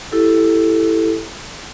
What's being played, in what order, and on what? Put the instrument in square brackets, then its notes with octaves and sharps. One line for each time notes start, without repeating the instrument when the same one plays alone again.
[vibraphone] E4 G4 A4